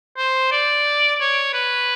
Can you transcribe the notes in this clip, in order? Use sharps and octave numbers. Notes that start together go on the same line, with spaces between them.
C5
D5
C#5
B4